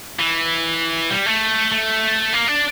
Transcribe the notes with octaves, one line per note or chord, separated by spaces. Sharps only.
E3
G3
A3
A3
A#3
D4